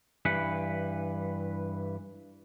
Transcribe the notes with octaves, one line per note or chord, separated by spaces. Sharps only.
G2 E3 B4